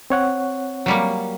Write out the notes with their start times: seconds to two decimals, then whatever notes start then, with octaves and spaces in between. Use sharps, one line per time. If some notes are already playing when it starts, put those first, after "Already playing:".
0.10 C4 C#5 F#5
0.86 F#3 G3 A#3